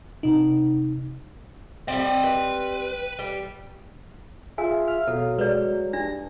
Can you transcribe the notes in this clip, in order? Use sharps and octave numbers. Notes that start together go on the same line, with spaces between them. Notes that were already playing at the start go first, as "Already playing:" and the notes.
C3 D#4
G3 C4 D5 D#5
B4
G3 G4
F4 G#4 E5 G#5
E5 F6
B2 F#3 A4 F5
G#3 B4 D5
G2 D4 A#6